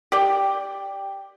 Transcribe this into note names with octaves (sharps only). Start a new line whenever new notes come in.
G4 D5 G5